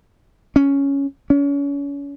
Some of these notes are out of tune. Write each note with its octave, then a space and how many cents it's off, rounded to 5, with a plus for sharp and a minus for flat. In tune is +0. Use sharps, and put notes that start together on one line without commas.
C#4 +5
C#4 +35